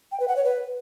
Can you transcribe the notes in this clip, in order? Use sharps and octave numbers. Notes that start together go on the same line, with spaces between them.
G5
B4
F#5
C#5
B4